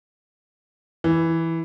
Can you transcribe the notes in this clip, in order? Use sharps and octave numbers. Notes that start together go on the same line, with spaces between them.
E3